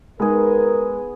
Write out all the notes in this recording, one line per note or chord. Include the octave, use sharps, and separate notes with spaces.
G#3 B3 D#4 G#4 A#4